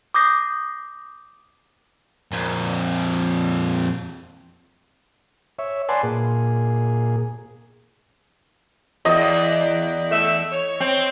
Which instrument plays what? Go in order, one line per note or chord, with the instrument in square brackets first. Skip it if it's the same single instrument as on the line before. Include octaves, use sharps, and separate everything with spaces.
[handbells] D6 D#6 G6 A#6 C7
[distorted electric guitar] F2 A#2
[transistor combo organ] C#5 E5
B4 D5 F#5 G#5 A5 C6
A#2 G#4
[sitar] E2 [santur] D#5
[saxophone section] A3 E5
C#5
[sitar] C4